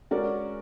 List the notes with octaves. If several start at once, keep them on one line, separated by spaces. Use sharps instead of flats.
G#3 C#4 F#4 A#4 D5